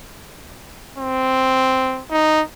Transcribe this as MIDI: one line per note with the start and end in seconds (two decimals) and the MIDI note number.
0.99 2.02 60
2.11 2.42 63